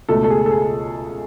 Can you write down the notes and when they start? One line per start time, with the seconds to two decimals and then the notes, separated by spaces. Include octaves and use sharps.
0.09 C#2 B2 A3 A4
0.24 A4
0.30 G#4
0.46 A4
0.51 G#4